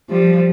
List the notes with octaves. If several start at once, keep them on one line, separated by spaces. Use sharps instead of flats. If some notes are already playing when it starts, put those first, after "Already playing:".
F3 G3